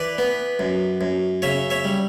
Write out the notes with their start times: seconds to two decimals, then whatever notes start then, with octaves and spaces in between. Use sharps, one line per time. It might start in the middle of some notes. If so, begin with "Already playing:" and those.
Already playing: E3 B4 D5
0.18 B3
0.59 F#2
1.01 F#2
1.42 C#3 C#5 E5
1.70 C#5 E5
1.84 G3